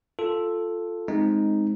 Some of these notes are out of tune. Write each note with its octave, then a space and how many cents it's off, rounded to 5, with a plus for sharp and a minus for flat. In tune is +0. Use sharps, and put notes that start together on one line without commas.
F4 +0 A4 +0
G#3 +5 C4 +0 D#4 +0